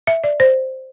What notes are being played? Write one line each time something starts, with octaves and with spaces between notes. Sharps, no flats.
E5
D5
C5